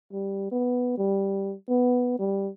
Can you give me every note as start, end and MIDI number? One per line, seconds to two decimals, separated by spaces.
0.12 0.47 55
0.52 0.93 59
0.97 1.54 55
1.69 2.16 59
2.19 2.50 55